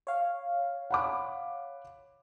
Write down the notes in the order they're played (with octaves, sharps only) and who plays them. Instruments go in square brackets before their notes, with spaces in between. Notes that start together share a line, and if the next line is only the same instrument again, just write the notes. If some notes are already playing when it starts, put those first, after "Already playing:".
[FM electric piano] C#5 F5
[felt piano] F#5 B5 D6